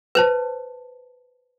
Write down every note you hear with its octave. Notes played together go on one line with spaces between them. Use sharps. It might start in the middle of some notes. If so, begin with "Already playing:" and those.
B4 C5 A5